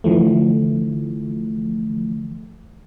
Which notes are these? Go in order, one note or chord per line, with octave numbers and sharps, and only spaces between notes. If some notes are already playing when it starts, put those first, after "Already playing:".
D3 E3 F3 A3